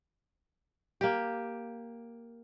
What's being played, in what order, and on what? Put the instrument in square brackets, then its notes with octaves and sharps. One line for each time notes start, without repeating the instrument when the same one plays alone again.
[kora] A#3 G4